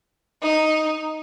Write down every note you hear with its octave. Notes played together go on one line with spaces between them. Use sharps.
D#4